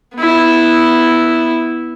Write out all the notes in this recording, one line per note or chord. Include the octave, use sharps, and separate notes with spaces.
B3 E4